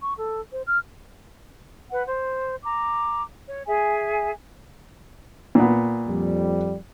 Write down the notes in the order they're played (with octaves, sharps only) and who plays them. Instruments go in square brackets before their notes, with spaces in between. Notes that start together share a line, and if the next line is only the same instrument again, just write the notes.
[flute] C#6
A4
C5
F6
[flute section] B4 F#5
C5
A#5 D6
C#5
G#4 E5 G#5
[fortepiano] A#2 B3
[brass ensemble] F2 G3